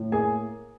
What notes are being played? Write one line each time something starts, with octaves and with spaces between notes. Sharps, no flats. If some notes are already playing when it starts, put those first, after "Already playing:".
Already playing: A2
A#3 G#4 G#5